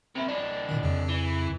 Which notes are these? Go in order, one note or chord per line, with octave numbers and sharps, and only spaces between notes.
C3 E4
E3 D4
A#2 D#3
F2 C#3
E3